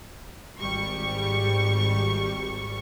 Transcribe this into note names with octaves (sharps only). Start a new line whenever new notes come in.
G#1 G3 C#6